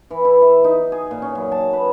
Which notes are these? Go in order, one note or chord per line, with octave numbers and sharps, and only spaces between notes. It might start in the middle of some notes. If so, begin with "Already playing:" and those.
E3
E4
E5
D#4
G#4
A#2
C#4
F#2
A5
B4